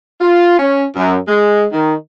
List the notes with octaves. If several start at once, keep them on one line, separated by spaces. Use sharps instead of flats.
F4
C#4
F#2
G#3
D#3